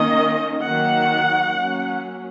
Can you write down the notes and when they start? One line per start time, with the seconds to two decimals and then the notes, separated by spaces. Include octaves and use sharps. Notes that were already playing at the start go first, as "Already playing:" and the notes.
Already playing: D#3 A#3 C#4 D#5
0.66 D#3 F#3 A#3 F#5
1.55 F#3 A#3 C#4